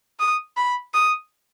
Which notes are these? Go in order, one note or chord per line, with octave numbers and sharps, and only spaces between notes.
D#6
B5
D#6